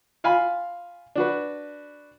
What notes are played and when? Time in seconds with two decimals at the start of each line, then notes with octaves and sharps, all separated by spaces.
0.24 F4 F5 G#5 B5
1.16 D4 F#4 B4